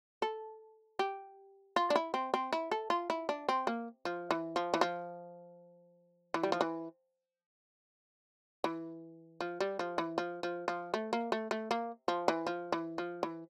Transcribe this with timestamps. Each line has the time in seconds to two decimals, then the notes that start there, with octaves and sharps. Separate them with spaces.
0.22 A4
0.99 G4
1.76 F4
1.90 D4
1.96 E4
2.14 C4
2.34 C4
2.53 E4
2.71 A4
2.90 F4
3.10 E4
3.29 D4
3.49 C4
3.67 A#3
4.05 F3
4.31 E3
4.56 F3
4.74 E3
4.81 F3
6.34 E3
6.43 G3
6.52 F3
6.61 E3
8.64 E3
9.41 F3
9.60 G3
9.79 F3
9.98 E3
10.18 F3
10.43 F3
10.68 F3
10.94 A3
11.13 A#3
11.32 A3
11.51 A3
11.71 A#3
12.08 F3
12.28 E3
12.47 F3
12.72 E3
12.98 F3
13.23 E3